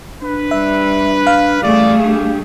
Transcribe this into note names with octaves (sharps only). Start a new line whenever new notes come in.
D4 B4
G3 E5
F5
A1 G3 A3 G#4 D5
D4 G4